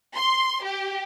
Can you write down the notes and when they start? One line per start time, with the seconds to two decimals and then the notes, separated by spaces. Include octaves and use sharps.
0.16 C6
0.65 G4